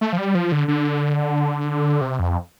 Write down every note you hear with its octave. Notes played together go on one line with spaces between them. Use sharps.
A3
F3
G3
F3
D3
D3
C3
F2